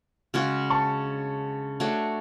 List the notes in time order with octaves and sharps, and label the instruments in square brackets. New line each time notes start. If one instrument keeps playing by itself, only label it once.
[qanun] C#3 G#3 C#4 F#4
[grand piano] A5 C#6
[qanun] A3 D4 F#4 C#5